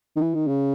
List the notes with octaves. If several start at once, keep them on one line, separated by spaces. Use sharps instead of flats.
D#3
E3
D#3
C#3